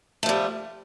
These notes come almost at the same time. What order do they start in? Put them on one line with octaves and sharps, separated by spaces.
A3 F3 G3